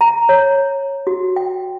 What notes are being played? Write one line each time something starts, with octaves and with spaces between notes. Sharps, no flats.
A#5
C#5
F#4
G5